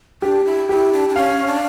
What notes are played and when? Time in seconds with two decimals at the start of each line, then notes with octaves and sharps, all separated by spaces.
0.22 D4 G4
0.45 E4
0.69 E4 G4
0.93 D4
1.09 D4
1.16 C#4 F5
1.47 D4